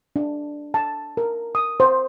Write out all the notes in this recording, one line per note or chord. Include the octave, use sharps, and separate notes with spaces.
D4
A5
A#4
D#6
C5